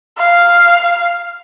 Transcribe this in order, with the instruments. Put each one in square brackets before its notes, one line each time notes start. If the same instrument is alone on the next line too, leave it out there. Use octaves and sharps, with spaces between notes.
[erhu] F5